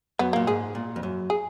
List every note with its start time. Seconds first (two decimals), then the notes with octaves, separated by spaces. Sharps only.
0.19 F#2 B3
0.33 A#2 A#3
0.47 G#2 G#4
0.75 A#2
0.96 F2
1.03 F#2
1.30 G#4